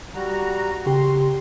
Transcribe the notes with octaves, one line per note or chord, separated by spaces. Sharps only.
G3 F#4 A#5
C#3 G4 C6